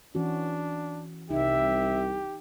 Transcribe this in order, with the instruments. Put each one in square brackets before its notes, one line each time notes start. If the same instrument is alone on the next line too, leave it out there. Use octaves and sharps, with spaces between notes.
[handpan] E3 C#4 F#4 [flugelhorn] D4
[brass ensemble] C2 [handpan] D#4 [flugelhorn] G4 [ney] E5